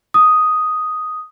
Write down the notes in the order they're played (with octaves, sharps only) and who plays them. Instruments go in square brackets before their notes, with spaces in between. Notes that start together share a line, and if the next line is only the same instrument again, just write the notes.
[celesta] D#6